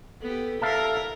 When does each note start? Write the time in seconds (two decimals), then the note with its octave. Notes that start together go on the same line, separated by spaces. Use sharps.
0.21 B3 G4 A4
0.62 E4 A#4 E5 F5 A5